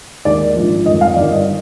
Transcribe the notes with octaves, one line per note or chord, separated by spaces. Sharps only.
D#2 D#3 G#3 D5
A#1 G#2 F3
G1 F2 D#3 D#5
F5
G1 G2 D#3 D5
D#5